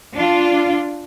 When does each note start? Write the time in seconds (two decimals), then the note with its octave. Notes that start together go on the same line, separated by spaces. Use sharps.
0.14 D4 F4